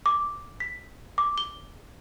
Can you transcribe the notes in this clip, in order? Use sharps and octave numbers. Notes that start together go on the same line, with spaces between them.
D6
B6
D6
G7